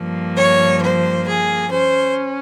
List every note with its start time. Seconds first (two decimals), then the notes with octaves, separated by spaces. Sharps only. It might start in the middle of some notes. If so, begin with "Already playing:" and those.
Already playing: G2 F3 A#3
0.37 C#5
0.82 C5
1.26 G#4
1.71 C#4 C5